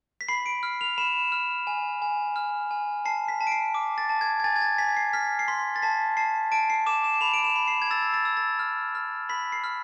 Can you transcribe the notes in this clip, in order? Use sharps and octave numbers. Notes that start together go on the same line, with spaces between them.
B6
B5 C7
D7
F6
F7
B5 E7
F6
G#5
G#5
F6
G#5
A5 C7
B6
A5
D7
C7
D6
A6
A5
G#6
G#6
G#5 A6
G#6
A6
G#5 B6
C7
F6 B6
C7
C6 B6
A6
A5 B6
A5 C7
A5 D7
C7
D6 E7
E7
B5 F7
D7
E7
B5
C7
G#6
E6 A6
A6
E6
A6
F6
F6
B5 B6
C7
F6